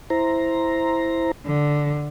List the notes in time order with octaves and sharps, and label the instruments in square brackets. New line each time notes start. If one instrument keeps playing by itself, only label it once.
[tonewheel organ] E4 C5 A#5
[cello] D3